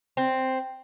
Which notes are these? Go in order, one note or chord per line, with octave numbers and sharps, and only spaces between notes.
C4